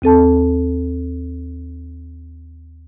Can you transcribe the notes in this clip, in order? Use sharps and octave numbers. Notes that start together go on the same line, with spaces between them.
D#2 C4 A4 A5